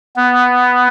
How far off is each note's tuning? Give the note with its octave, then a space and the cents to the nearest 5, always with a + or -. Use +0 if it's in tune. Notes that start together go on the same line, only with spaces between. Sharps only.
B3 +5